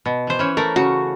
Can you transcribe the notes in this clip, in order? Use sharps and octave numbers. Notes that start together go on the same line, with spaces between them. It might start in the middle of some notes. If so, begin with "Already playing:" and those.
B2
E3 C5
E3 C#4
A3 A#4
C#3 F#4